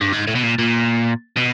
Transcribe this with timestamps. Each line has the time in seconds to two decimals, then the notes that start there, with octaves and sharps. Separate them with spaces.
0.01 G2
0.13 G#2
0.28 A2
0.35 B2
0.43 A#2
0.59 A#2
1.36 B2